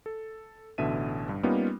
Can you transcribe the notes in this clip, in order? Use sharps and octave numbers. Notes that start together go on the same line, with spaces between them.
A4
A1 B2 D3 E5 D#7
G2
G3 A#3 B3 C#4 D#4 F4